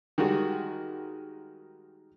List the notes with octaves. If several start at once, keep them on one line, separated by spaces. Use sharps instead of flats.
D#3 G3 G#3 F#4